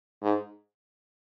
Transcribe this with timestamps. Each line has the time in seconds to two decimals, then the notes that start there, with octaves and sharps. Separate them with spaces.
0.23 G#2